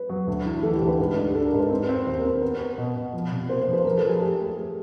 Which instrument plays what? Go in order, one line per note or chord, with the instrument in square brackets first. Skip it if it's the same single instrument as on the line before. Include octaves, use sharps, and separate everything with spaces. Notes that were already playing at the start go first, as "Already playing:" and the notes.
Already playing: [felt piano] B4
[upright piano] F#3
D2
E3
[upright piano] E3 [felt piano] A4
[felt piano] G4
[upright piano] D2
[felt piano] B4
[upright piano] G#2
D4
[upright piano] D4 [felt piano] A4
[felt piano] A#4
[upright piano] G#2
[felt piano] B4
[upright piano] C4
C4
[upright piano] D#2 [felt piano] C5
[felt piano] A#4
[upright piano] C4
[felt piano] A#4
[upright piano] B3
B3
B2
B2
F3
C3
[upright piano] A#3 [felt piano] C5
[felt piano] C5
[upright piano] F3
[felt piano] B4
[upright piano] F3 [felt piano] A#4
[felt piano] A4
[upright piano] F3
[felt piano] G#4
[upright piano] A3 [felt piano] G4
[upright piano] A3
A3